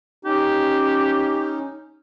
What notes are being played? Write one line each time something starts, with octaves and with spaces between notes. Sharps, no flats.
C#4 D#4 G4